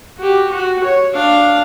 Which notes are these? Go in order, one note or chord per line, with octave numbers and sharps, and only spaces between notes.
F#4 G4
F#4
C#5
D4 F5